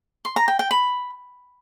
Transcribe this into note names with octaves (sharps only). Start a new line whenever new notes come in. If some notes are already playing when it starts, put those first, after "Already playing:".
C6
A#5
G5
G5
B5